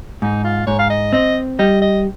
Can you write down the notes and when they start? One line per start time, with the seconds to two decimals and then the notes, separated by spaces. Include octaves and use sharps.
0.22 G#2 D#4
0.44 F4
0.67 G#2 C#5
0.79 F5
0.90 D#5
1.13 C4 D#5
1.59 G3 D#5
1.81 D#5